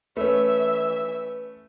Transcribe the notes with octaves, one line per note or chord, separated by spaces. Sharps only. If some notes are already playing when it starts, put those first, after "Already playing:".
E3 A3 C#4 B4 E5